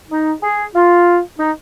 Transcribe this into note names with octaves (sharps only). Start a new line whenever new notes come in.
D#4
G#4
F4
D#4